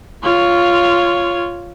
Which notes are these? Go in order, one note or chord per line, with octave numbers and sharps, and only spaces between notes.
F4 C#5